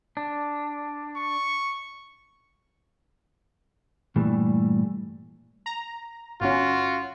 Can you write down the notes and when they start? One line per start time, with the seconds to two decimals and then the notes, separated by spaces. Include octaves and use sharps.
0.17 D4
1.16 C#6
4.16 G2 A#2 E3 G3 A3
5.66 A#5
6.41 G1 C#4 F4 F#4